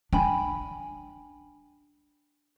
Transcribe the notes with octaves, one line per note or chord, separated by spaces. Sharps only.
D4 G5 G#5 B5